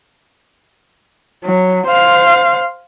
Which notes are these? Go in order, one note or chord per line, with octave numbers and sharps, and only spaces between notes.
F#3
C5 F5